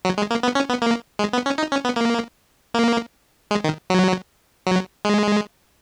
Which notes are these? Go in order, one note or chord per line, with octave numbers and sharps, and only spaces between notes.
F#3
G#3
A#3
B3
C#4
B3
A#3
G#3
B3
C#4
D#4
C#4
B3
A#3
A#3
G#3
D#3
F#3
F#3
G#3